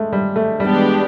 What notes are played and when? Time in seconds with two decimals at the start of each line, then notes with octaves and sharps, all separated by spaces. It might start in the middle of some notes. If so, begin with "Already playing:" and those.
Already playing: G#3 A3
0.13 G3
0.36 A3
0.60 E3 G3 G#3 B3 D4 G4